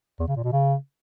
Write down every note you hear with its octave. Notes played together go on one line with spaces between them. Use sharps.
E2
C#3
A#2
B2
C#3